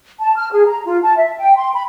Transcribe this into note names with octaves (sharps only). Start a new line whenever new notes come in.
A5
F6
G#4
A#5
F4
A5
E5
G5
C6
B5